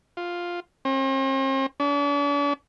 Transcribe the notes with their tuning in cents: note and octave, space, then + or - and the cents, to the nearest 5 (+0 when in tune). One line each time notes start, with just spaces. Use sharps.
F4 +5
C4 +45
D4 -45